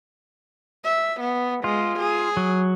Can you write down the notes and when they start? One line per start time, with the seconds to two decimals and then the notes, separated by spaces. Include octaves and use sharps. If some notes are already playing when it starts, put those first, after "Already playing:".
0.85 E5
1.20 B3
1.64 G#3 F4
1.99 G#4
2.37 F#3